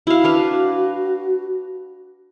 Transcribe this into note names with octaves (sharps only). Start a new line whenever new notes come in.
E4 F#4 F5
D4 B4 F5